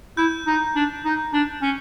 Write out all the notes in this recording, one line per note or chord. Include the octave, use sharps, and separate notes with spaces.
E4 G6
D#4
D4
D#4
D4
C#4